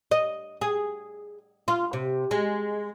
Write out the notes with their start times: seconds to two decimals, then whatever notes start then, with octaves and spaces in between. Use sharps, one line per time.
0.11 D#5
0.61 G#4
1.68 F4
1.93 C3
2.31 G#3